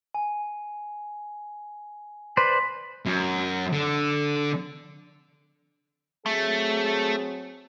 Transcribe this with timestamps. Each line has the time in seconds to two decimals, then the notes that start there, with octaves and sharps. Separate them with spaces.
0.14 G#5
2.37 B4 C5 D5 C6 B6
3.06 F#2
3.73 D3
6.26 F#3 A3 C4 G#4